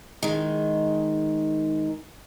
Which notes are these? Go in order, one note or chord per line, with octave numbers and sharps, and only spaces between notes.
D#3 G#3